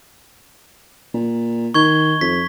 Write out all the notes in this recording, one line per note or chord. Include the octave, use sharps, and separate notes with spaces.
A#2
D#3 C#6 G#6 G7
F2 B6